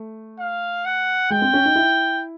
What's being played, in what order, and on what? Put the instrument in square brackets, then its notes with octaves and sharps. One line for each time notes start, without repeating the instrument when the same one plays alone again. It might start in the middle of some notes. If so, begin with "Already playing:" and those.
Already playing: [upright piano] A3
[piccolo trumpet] F5
F#5
[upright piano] G#3 [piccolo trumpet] G5
[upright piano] C4
C#4
D#4
E4